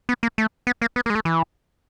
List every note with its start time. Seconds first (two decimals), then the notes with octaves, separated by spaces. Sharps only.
0.09 B3
0.23 A#3
0.38 A3
0.67 B3
0.82 A#3
0.96 B3
1.06 A#3
1.10 G#3
1.15 A3
1.25 E3